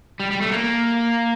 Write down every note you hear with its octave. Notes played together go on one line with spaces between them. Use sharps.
G3
G3
A3
A#3